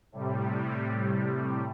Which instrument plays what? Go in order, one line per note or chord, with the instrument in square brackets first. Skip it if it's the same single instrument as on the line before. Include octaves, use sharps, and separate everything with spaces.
[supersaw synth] A2 C3 G3